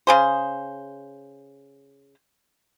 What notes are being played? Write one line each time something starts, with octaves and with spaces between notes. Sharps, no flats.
C#3 G#4 C5